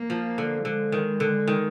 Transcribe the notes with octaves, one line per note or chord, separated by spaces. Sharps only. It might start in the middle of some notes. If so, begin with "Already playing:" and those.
Already playing: A#3
F3
D3
D3 G#3
D#3
D3
D#3